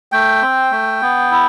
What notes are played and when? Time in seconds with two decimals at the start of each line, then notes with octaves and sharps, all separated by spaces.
0.12 A3 G5
0.42 C4
0.71 A3
1.01 B3
1.31 E4